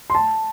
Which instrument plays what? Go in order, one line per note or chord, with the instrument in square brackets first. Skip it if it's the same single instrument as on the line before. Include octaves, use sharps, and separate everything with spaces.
[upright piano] C6
A5